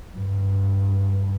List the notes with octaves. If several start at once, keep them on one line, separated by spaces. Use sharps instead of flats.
G2